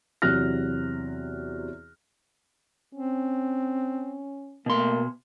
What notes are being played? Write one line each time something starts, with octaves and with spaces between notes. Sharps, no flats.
E2 C3 F#3 F6 F#6 A#6
C4 C#4
B2 A3 A#3 C6